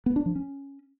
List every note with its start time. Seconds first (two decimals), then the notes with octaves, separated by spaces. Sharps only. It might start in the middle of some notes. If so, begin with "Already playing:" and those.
0.06 B3
0.16 D4
0.26 F3
0.35 C#4